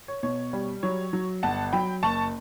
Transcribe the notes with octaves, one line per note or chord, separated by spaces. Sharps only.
C#5
B2 C#5
G3
F#3 C#5
F#3
G1 F#5 A5
F#3 G5 B5
F#1 A5 C#6